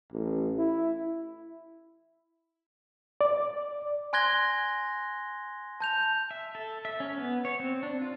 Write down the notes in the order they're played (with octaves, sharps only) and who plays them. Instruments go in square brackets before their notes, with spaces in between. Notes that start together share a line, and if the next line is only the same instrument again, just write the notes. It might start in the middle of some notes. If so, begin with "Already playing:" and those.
[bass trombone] A1
E4
[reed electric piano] D5
[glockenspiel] G#5 C6 F#6 G#6 A#6 G7
A5 G6 F7
[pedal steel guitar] E5
A4
E5
C#4
B3
C#5
C4
D4
F4